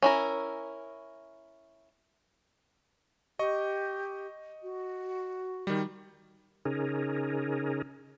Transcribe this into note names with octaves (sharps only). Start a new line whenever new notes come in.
C#4 E4 A#4
G4 D#5 C#6
F#4
D#3 G3
C#3 C#4 D#4 G#4 A#4